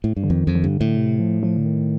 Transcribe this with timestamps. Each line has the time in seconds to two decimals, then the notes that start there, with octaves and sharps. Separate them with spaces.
0.04 A2
0.17 G2
0.23 D3
0.30 F2 D#3
0.47 F2
0.55 D#3
0.64 G2 D3
0.81 A2
0.97 C3
1.20 F3
1.43 F3
1.57 D3
1.65 D#3